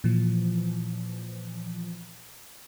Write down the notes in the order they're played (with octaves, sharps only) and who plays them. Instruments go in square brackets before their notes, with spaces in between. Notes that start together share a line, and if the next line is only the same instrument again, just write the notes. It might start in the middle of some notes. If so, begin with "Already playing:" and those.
[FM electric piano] A#2 E3 F3